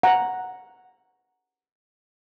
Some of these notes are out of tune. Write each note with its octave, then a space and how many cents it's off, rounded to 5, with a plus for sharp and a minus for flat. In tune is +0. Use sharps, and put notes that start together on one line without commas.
F#5 +0 A#5 +0